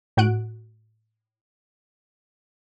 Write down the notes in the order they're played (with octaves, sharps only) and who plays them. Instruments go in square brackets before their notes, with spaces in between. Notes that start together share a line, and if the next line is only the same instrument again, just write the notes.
[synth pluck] A2 F#4 F#5 F#6 D7